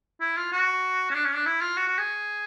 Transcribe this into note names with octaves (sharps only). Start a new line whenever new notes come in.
E4
F4
F#4
C#4
D4
C#4
D4
E4
F4
F#4
F#4
G#4